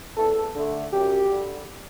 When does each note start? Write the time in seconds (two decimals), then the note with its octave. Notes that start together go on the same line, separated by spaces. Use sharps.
0.17 E2 A4
0.55 D3 A3
0.93 F#2 G4
1.30 D3 G3